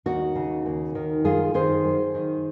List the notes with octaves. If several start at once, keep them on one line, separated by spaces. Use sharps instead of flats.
D#2 D#4 F#4
C#3
D#2
D#3
F#2 F4 G#4
D#3 G#4 C5
F#2
D#3